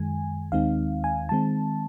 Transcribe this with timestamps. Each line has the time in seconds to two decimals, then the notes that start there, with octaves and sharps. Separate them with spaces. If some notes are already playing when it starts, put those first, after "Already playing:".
Already playing: F#2 D#3 G#3 G#5
0.52 D#2 D#3 G#3 C4 D#4 F5
1.04 G#5
1.29 D#3 G#3 C4 A5